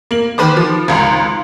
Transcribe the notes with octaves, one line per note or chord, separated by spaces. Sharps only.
A#3 F#7
D#3 B4 C5 D6
F3
G#1 C#2 A#5 C6